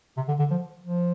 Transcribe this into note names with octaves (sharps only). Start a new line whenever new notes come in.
C3
D3
D3
F3
F3